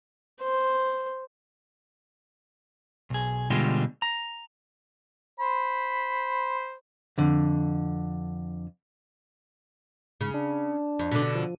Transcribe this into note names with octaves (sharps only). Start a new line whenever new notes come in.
C5
B1 G#4
B2 D3 G3 G#3 F4 G4
A#5
C5 B5
F2 D3
G#2 C#3
D4
F2
B2 D3
F3